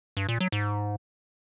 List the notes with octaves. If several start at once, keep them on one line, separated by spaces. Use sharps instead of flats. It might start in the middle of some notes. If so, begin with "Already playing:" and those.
G2
A#2
F#3
G#2